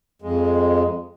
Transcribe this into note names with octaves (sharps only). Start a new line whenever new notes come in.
F2 G#3